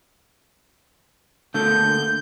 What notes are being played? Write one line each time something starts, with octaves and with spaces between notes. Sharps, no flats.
D3 A3 A#3 G6